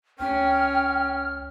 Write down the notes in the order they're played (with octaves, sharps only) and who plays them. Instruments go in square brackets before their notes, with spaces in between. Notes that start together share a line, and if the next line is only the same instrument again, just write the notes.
[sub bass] C#2 [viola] C#4 [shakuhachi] G5 [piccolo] F6